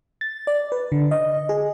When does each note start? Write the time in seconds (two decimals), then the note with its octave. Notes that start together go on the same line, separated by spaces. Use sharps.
0.21 A6
0.47 D5
0.72 B4
0.92 D3
1.11 D#5
1.49 G#4